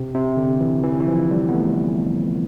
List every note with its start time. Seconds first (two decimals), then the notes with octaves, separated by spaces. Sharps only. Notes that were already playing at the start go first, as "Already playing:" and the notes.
Already playing: C3
0.14 C3
0.37 D3
0.60 E3
0.84 E3
1.01 E3
1.07 F3
1.31 G3
1.49 B3
1.54 A3